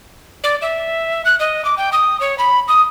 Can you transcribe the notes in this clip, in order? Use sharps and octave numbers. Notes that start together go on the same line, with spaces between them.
D5
E5
F#6
D#5
D6
G5
D#6
C#5
B5
D#6